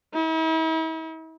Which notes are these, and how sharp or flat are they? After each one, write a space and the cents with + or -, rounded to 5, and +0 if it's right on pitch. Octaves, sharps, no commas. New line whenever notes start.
E4 -45